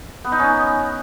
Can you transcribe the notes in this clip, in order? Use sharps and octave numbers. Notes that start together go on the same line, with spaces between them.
B3
D#4
C#4